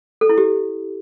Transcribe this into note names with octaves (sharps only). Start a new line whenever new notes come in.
A4
E4
G4